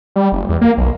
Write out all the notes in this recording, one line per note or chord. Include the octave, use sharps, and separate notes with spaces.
G3
F#1
E2
A#3
B1